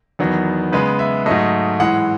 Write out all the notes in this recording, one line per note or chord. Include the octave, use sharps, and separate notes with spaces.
E2 D#3 F#3 B3
C#3 G#3 B3 B4
E5
G#2 F#3 A3 D#5
A2 E3 G#3 F#5